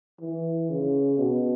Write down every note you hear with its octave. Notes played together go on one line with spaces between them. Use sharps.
E3
C#3
B2